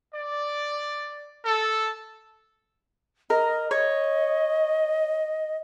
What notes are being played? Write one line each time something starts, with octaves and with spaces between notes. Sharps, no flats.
D5
A4
A#4 D#5
C#5 D#5